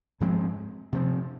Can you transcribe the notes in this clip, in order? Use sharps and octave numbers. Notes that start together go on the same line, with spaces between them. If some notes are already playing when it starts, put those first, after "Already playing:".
G#2 F3 G#3 C4
C3 F3 C4